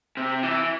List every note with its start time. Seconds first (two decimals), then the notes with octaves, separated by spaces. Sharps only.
0.17 C3
0.43 E3